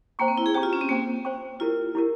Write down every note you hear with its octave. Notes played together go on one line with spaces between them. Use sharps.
A#3 C5 G5 A#5 C#6
C4
E4
G#4
G4 C5 G5 A#5 C#6
F4
C#4
C4
A#3 C5 G5 C#6
C5 G5 C#6
E4 F4 G4 A#4
E4 G4 A#4